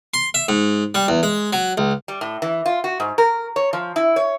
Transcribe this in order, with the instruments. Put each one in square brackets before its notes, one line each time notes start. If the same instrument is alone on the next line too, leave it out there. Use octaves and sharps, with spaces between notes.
[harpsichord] C6
E5
G#2
G3
E2
G#3
F#3
C#2
[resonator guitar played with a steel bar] G3
A2
E3
F4
F#4
G#2
A#4
C#5
F3
E4
C#5